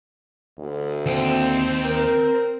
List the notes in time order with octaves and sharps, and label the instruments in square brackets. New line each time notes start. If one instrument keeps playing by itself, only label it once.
[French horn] D2
[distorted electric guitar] D#2 [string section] C4
[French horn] A#4